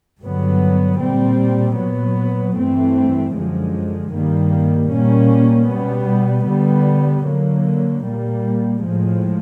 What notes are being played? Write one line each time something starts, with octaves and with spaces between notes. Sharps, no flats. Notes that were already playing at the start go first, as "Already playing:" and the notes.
G2 D3 F#3 B3
A#2 G3 C4
A#2 F#3 B3
G2 E3 A3 C4
F#2 D3 F3 G#3
G2 D#3 G3 A#3
A#2 G3 A#3 C#4
B2 G3 B3
D3 G3 B3
D3 F#3 A#3
A#2 G3 A#3
A2 F3 G#3